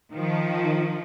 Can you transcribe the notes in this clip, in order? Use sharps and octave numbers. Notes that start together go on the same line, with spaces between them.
D#3 F3